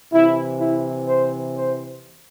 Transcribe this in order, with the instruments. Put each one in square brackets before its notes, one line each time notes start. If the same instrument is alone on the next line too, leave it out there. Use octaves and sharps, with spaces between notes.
[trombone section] C3 E3 E4
E4
C5
C5